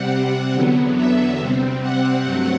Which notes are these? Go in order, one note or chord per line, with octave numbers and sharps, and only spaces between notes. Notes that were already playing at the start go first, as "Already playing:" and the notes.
Already playing: C3 G3 C4 F#5
E2 D3 F#3 B3
E5
C3 G3 C4
F#5
G2 F#3 A3 C4 F#5